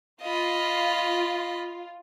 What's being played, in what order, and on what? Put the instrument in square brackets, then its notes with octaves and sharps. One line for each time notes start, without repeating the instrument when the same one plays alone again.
[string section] F4 [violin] D#5 B5